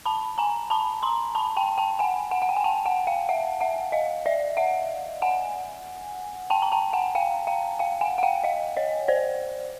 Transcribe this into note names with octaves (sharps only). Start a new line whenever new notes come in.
A5 B5
G#5 A#5
A5 B5
A#5 C6
A5 B5
G5 A5
G5 A5
F#5 G#5
F#5 G#5
F#5
G5
G#5
G5 A5
F#5 G#5
F5 G5
E5 F#5
E5 F#5
D#5 F5
D5 E5
E5 F#5
F#5 G#5
G5 A5
A#5
G5 A5
F#5 G#5
F5 G5
F5 G5
F5 G5
F#5 G#5
F#5
F5 G5
D#5 F5
C#5 D#5
C5 D5